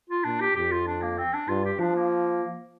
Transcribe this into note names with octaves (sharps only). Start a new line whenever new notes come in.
F4
A#2 D4
G4
F2 G4
F4
D4
A#3
C4
D4
G2 F4
G4
F3 D4
A#3